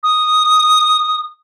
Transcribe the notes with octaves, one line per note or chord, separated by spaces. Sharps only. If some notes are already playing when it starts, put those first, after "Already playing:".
D#6